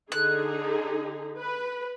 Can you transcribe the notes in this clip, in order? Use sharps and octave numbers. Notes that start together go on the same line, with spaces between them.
D3 D#4 G#4 F#6
B4